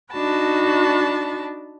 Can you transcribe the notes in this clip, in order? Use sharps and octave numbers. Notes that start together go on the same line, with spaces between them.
D4 D#4 F#4 A5 B5